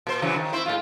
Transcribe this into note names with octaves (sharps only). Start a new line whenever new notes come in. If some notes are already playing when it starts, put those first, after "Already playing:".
A#2 C5
C#3 E3 F#3
D#3
C4 E4 C5
A2 G#3 F4